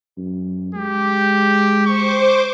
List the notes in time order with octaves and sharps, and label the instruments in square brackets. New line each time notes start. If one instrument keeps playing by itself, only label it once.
[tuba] F#2
[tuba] G#3 [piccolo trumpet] G4
[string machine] C5 D6 [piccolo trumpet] C#6